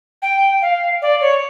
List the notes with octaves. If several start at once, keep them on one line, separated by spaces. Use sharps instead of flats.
G5
F5
D5
C#5